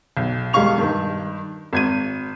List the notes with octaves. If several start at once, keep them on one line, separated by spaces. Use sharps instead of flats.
B1
E1 G3 G#3 F5 C#6 F7
G2 D#3
G#1 G#6 D#7